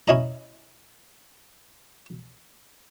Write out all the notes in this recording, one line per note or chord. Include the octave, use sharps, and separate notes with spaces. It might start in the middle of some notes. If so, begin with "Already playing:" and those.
C#4 E4 D#5 A#5